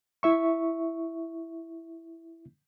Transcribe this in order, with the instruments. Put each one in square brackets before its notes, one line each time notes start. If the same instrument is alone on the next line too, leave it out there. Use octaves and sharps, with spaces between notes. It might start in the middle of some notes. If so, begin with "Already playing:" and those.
[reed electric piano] E4 E5 C#6